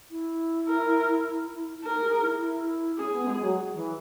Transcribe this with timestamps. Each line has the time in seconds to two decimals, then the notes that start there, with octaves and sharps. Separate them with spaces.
0.11 E4
0.68 A#4
1.83 D#4 A#4
2.02 G#4
2.21 E4
2.40 E4
2.98 C#4 G#4
3.12 B3
3.27 G#3
3.41 F#3
3.74 E3